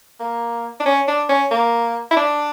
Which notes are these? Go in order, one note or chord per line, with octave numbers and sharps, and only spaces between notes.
A#3
D4
C#4
D4
C#4
A#3
E4
D4